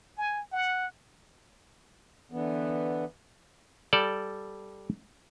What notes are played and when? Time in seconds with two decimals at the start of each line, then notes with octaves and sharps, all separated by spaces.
0.18 G#5
0.52 F#5
2.32 D3 E3 B3
3.93 G3 A4 D5